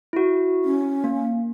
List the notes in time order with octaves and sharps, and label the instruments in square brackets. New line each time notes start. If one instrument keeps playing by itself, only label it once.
[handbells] E4 F#4
[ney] C#4
[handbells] A#3